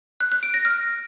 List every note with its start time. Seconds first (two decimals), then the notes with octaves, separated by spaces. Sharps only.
0.20 F#6
0.32 F#6
0.43 D7
0.54 A#6
0.65 F6